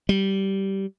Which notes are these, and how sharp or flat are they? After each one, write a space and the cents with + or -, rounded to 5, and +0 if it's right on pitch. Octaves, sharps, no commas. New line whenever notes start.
G3 -15